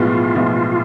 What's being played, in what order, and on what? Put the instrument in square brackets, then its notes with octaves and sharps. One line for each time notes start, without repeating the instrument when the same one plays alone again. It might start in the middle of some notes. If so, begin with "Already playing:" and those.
Already playing: [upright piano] B1 A2 F3 G#3 B3 [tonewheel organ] F4
[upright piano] B1 A2 F3 G#3 B3